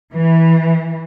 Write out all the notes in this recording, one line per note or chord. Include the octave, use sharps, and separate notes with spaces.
E3